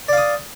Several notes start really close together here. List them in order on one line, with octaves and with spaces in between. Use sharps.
D5 F5 D#6